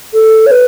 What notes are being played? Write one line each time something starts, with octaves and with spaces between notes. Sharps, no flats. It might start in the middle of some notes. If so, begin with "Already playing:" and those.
A4
C#5
B4